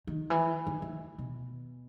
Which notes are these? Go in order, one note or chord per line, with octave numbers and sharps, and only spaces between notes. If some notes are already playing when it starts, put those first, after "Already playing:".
D#3
E3
D#3
D#3
B2